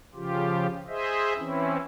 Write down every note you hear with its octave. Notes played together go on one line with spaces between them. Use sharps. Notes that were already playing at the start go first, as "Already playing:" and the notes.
C#3 F3 F4 G4
G#4 C5 D#5 E5
E3 C4 C#4 E4